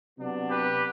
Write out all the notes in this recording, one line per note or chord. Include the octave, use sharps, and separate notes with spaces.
C3 F#3 B3 D4
G4 B4